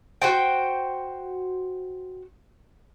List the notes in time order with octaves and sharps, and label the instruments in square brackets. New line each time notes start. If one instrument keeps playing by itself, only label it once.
[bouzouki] F#4 C5 G5